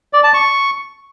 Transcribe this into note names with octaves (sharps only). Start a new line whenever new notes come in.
D5
A5
C#6